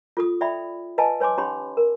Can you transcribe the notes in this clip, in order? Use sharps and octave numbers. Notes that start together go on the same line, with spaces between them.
F4 A4 D#6
D5 E5 G5 B5
B4 D#5 F5 G#5 A5
B4 C#5 G#5 C6 D6
C#4 D#4 G4 C#5 B5 C6
A#4